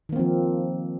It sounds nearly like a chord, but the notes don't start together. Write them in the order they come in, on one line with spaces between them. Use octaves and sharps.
D#3 A#3 C4 F3